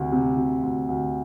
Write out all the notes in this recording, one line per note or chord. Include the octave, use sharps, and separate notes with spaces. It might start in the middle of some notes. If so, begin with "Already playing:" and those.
Already playing: D2 C3
C3
C3
D2
D2